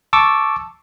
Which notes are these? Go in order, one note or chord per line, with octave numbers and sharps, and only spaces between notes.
A5 C#6 D6 E6